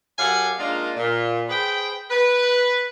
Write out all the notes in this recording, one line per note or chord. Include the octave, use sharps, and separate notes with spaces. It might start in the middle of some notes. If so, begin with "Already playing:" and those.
F#2 G4 A4 F5 F#5 G#5
G#3 A#3 D4 D#4 F4 A#4
A#2
G#4 B4 C5 G5
B4